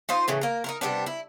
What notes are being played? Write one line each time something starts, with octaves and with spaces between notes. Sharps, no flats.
D#4 F4 C5
A2 C#3 E3
A#3 A#4
D#4 E4 A#4
C3 G3 B3 D4
E4